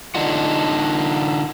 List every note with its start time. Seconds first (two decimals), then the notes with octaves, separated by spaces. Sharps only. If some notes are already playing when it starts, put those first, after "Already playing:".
0.15 D3 D4 D#4 F4 F#5